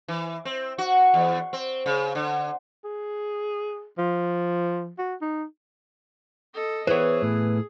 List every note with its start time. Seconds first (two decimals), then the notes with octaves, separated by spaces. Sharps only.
0.08 E3
0.45 C4
0.78 F#4
1.14 E2
1.53 C4
1.86 C#3
2.15 D3
2.85 G#4
3.98 F3
4.98 F#4
5.22 D#4
6.54 A4 D#5
6.87 E3 B3 G#4 C5 C#5
7.22 A2